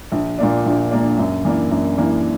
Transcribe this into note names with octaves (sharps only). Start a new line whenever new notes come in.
A#1
A#2 A#3 D4
A#1
A#2 A#3 D4
F#2
E3 A#3 D4
F#2
E3 A#3 D4